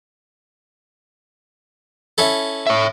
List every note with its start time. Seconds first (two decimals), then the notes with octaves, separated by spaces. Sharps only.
2.18 C#4 E4 A4
2.67 C#5 E5